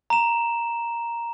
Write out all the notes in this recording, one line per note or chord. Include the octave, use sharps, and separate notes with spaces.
A#5 E7